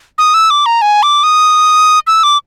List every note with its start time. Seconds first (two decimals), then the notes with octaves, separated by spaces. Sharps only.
0.18 D#6
0.34 E6
0.50 D6
0.66 A#5
0.82 G#5
1.03 D6
1.23 D#6
2.07 E6
2.23 D6